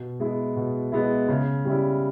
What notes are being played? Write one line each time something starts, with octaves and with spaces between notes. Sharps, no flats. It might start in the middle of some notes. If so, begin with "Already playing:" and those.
Already playing: B2
G#3 B3 E4
B2
G#3 B3 E4
C#3
G3 C#4 E4